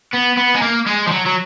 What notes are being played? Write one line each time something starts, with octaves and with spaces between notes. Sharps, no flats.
B3
B3
G#3
A#3
G#3
F3
F#3
F#3